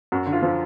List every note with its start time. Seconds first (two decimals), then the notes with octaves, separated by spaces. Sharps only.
0.12 F#2 F#4
0.26 D3
0.33 F4
0.42 F3